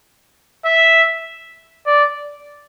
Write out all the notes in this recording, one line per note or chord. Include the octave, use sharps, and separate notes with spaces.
E5
D5